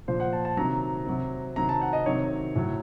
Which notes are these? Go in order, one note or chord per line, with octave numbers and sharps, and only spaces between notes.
A#2 F3 C5
F#5
A5
A5
C3 D#3 F#3 A#5
C3 F#3
C3 D#3 F#3 A#5
A5
F#5
D#5
C3 D#3 F#3 C#5
A2 F#3